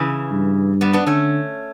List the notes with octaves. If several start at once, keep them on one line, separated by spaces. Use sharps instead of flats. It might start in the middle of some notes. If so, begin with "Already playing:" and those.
Already playing: C#3 E3
G2
G3 B3
B3 D4
D3 A3 C#4